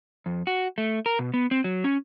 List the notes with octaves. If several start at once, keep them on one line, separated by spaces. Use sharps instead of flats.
F2
F#4
A3
A#4
B2
B3
C4
F#3
C#4